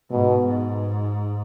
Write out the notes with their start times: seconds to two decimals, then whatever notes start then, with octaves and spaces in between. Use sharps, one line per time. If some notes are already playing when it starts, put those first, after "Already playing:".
0.11 G#2 B2
0.48 G#2